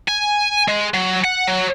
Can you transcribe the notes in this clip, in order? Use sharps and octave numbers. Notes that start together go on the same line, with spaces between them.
G#5
G#3
F#3
F#5
F#3